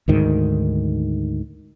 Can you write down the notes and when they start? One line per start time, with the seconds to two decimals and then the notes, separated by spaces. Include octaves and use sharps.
0.08 D2 G#2 D#3